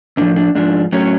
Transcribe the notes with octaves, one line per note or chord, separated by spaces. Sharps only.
A2 F3 D4
D4
G#2 F3 D4
A2 F#3 C#4